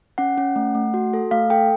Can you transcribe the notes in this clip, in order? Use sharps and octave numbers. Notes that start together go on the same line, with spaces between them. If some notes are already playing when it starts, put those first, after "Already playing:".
C#4 F#5
C#4
A3
A3
F#4
A4
A3 F5
A4 G5